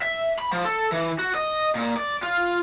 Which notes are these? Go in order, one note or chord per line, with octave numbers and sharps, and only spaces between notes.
E5
B5
F3
A4
E3
F#4
D#5
A#2
D5
F4